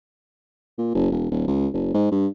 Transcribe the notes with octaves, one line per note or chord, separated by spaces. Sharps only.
A#2
F#1
E1
D#1
C#2
F#1
G#2
G2